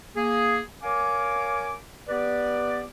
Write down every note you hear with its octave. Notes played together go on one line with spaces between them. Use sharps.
A#3 G#4
A#4 C#5 F5 G#5 D6
B3 G4 B4 D5